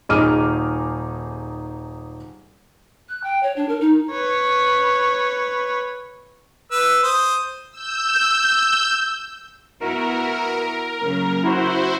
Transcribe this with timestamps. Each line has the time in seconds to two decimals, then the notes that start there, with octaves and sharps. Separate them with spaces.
0.09 D#1 D#4 G#4 D6 F6 D#7
3.08 F#6
3.23 G5
3.42 C#5
3.56 D4
3.68 A#4
3.80 D#4
4.11 B4 C#5
6.72 B4 E6
7.03 C5 D#6
7.71 E6 G6
9.81 B3 E4 F#4 A#4
11.02 C#3 F#3 A#3
11.43 E4 F#4 C5